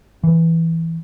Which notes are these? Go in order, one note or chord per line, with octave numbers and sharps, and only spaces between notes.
E3